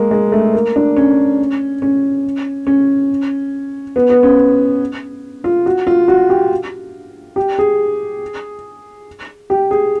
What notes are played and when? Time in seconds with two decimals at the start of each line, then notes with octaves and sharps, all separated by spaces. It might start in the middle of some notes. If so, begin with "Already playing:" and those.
Already playing: G#3 A#3
0.11 G#3
0.32 A3
0.54 A#3
0.76 D4
0.97 C#4
1.82 C#4
2.67 C#4
3.96 B3
4.10 B3
4.23 C#4
5.44 F4
5.66 F#4
5.87 F4
6.08 F#4
6.30 G4
7.36 G4
7.59 G#4
9.50 G4
9.71 G#4